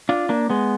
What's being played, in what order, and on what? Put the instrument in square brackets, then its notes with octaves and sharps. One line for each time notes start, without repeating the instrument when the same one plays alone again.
[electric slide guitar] D4 F4
A#3 D4
G#3 B3